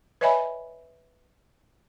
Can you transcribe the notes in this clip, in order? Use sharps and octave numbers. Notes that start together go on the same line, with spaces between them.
B4 C#5 D#5 E5 G#5 B5